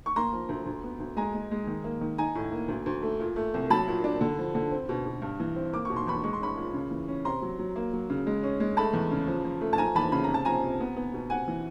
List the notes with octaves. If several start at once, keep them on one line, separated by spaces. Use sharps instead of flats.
C#6
A#3 A#5 C6
F3
D2
D2
B3
D2
G#3 G#5 A#5
G#3
G#3
D#3
A#3
D#3
D#4 G#5 A#5
A2
A#3
D2
D2
A3
A#2
A3
C2
F#3 A5 B5
A#2
D4
D3
F3
D3
C4
B2
B2
G2
E3
C4
A#3 D6
B2 C#6
C6
E2 B5 C#6
G#3 C#6
C6
C#4 B5 C#6
A#2
C#3
E3
C#4
C3 A#5 C6
F#3
F#3
A#3
F#3
C#3
G#3
C#4
G#3
A3 A5 B5
E2
C#3
F3
F3
A3
A5
F3 G#5 A#5
E2 A5 B5
C#3 B5
A#5
C3
A5
F3 G#5 A#5
C3
B3
B3
B2
C3 F#5 G#5
E3